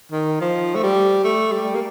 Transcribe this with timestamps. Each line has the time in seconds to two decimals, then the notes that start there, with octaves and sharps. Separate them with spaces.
0.12 D#3
0.41 F3
0.75 A3
0.83 G3
1.24 A3
1.52 G3
1.75 A#3